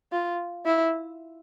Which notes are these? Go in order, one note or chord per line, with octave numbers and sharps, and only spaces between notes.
F4
E4